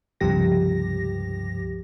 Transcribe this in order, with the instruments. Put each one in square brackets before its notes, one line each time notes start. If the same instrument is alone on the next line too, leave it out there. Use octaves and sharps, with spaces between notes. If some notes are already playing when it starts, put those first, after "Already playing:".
[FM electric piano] C#2 G2 C3 F3 G4 A#6